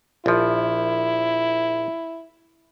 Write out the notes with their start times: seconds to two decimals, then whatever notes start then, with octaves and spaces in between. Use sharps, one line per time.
0.26 A#1 F3 E4